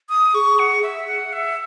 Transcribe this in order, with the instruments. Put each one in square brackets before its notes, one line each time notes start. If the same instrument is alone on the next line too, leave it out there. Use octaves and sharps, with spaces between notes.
[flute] D#6
[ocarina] G#4 [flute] C#6
[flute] F#5
E5
F#5
E5